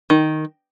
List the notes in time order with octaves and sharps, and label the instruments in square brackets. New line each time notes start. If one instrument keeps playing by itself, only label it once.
[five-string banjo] D#3